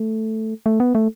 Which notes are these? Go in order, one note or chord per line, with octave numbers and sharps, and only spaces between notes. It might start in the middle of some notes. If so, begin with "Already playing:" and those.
Already playing: A3
A3
B3
A3